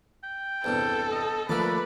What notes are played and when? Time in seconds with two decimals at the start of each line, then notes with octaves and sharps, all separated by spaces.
0.23 G5
0.64 E2 G2 C3 A4
1.12 D#5
1.49 F3 A3 A#3 B4 D5 D6 E6